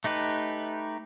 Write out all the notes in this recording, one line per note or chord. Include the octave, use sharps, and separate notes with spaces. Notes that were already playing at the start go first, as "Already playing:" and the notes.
A3 D#4 G4 B4